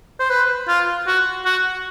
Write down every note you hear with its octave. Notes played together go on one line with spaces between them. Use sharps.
C5
B4
F4
F#4
F#4